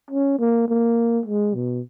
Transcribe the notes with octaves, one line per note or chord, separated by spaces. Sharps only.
C#4
A#3
A#3
G#3
B2